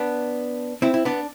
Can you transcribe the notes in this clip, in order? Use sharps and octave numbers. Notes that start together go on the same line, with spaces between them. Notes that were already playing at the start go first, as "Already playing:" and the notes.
Already playing: B3 D4
C4 E4
E4
B3 D4